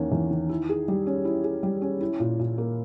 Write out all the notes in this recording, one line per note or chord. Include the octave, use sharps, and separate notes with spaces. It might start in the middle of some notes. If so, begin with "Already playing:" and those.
Already playing: E2 D#3 A#3 C#4
E2
D#3
E4
G#4
G3
C#4
E4
G#4
G3
C#4
E4
A#2
A#2
A#3